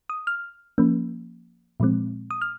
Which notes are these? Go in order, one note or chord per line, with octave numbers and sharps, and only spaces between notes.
D#6
F6
F3 A#3 C#4
A#2 F3 G#3 C4
D#6
F6